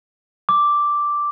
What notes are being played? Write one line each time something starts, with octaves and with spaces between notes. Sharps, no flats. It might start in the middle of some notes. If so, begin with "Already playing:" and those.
D6